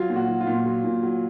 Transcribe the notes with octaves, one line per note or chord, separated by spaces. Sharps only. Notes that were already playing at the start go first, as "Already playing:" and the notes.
Already playing: F#3 F4
A#2
F#4
F#3
F4
A#2
F#3
A#2
F#3